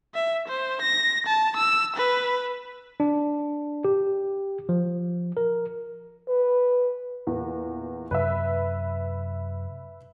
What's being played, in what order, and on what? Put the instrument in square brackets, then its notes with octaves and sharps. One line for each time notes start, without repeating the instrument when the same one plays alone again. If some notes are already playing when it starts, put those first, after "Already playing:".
[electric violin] E5
C5
A#6
A5
E6
B4
[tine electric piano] D4
G4
F3
A#4
[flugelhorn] B4
[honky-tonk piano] E2 A#2
[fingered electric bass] F#2 C3 F#3 [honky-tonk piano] B4 E5